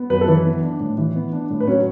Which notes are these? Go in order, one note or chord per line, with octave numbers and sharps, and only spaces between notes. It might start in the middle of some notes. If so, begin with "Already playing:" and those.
Already playing: B3
F#2 B4
A4
E3 B4
B3
D4
A2
E3
B3
D4
A2
B4
F#3 C#4 C#5